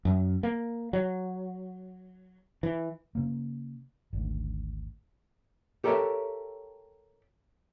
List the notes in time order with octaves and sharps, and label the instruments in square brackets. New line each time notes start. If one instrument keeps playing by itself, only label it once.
[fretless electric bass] F#2
A#3
F#3
E3
[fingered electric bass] C#3 A#3
G#1 D2
[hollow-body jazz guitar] G4 A4 A#4 C#5 E5